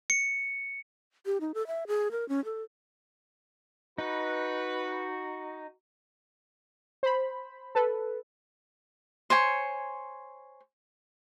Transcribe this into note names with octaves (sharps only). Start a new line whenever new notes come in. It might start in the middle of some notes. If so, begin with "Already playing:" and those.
C#7
G4
D#4
A4
E5
G#4
A#4
C#4
A4
D#4 F#4 B4
C5 B5
A4 B4
C5 C#5 G#5 C#6